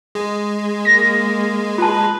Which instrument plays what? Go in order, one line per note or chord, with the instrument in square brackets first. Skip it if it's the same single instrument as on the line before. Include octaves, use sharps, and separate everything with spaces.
[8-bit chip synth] G#3
[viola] A#3 [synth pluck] A#6
[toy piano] F4 A5 [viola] B4